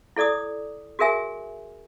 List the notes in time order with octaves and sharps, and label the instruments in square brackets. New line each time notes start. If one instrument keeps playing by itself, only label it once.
[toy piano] E4 A4 D5 D6 D#6
F#4 G#4 A#4 E5 G#5